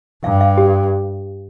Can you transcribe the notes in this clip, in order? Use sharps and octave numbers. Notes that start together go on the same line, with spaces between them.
G2 F5
F5
G4